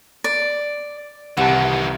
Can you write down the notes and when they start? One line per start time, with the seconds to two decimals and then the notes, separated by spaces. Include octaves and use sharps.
0.24 D5
1.37 C2 D#3 E3 G4 F#5 A5